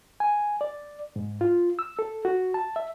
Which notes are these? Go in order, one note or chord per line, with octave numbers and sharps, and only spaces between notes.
G#5
D5
G#2
F4
E6
A4
F#4
A5
E5